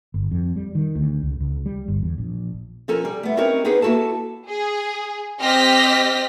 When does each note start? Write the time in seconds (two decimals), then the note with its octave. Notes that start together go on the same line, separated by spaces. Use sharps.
0.14 G1
0.31 F2
0.56 G3
0.75 D#3
0.95 D2
1.23 C#2
1.40 C#2
1.66 G3
1.88 G1
2.03 E2
2.18 A#1
2.88 F3 C#4 A4 A#4 G#5
3.05 G3
3.23 A3 B3
3.37 C4 C#4 D#4 G4 A#4 C#5
3.65 B3 D#4 G4 G#4 B4 C5
3.82 A#3 E4 F#4 A4 A5
4.48 G#4
5.41 C4 G4 D#5 F6 A#6 B6